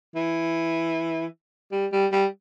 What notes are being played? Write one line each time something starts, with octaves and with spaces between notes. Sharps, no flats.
E3
G3
G3
G3